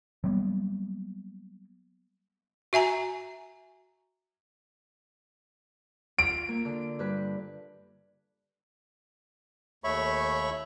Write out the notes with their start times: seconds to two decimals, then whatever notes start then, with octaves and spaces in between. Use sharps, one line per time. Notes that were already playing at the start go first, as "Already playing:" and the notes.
0.24 F#3 G3 A#3 B3
2.73 F#4 E5 G#5 A#5
6.19 F4 D7
6.49 A#3
6.65 D3
6.99 G2 B4
9.84 D#2 A3 C#5 E5 B5 C#6